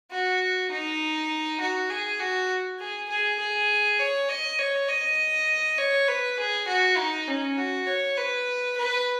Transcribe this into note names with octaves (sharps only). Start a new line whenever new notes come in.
F#4
D#4
F#4
G#4
F#4
G#4
G#4
G#4
C#5
D#5
C#5
D#5
C#5
B4
G#4
F#4
D#4
C#4
F#4
C#5
B4
B4